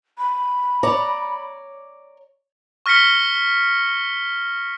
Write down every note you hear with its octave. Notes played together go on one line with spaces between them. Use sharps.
B5
C#5 D5 A#5
C#6 F6 A#6 B6 C#7 G7